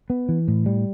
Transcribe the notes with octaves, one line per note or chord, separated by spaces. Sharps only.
B3
E3
A2
G3